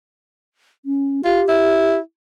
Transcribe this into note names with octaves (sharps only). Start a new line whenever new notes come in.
C#4
F4 G4
E4